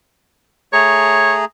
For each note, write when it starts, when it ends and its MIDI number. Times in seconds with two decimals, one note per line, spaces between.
0.73 1.45 57
0.73 1.45 68
0.73 1.34 73
0.73 1.45 82